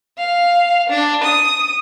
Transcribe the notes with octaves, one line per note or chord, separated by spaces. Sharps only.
F5
D4
D#6